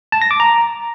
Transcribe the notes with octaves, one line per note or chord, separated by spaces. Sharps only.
A5
A#6
D6
A#5